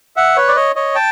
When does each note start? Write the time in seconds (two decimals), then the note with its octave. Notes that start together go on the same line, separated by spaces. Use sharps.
0.16 E5 F#5
0.36 B4 C#5
0.48 D5
0.56 C#5 D#5
0.75 C#5 D#5
0.95 G5 A5